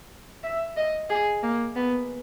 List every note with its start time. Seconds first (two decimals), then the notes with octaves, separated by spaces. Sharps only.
0.43 E5
0.77 D#5
1.10 G#4
1.43 A#3
1.76 B3